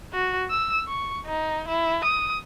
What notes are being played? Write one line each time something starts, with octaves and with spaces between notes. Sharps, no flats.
F#4
E6
C#6
D#4
E4
D#6